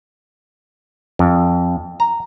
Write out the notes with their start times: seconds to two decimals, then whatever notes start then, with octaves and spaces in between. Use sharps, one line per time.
1.19 F2
2.00 A#5